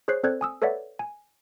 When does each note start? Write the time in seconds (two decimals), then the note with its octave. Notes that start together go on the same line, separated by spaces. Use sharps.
0.08 G#4 C5 C#5 F#6 C7
0.24 C4 A4 C5 D5 F#6 G#6
0.41 G#5 D#6 E6
0.62 A4 B4 C#5 D5 E5 F#5
0.99 G#5